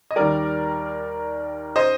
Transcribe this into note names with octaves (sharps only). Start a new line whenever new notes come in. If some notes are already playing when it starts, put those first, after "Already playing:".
D#5
D#2 D#3 G3 A#4 D5
C5 D#5